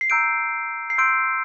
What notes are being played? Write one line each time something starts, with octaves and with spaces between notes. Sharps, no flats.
C7
A#5 E6 G6 D7
C7
C6 E6 G6 D7